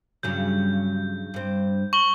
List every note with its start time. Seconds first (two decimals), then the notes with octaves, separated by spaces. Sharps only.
0.23 G2 C#3 F#3 G6
1.34 G2 C4
1.93 C#6 F#7 G7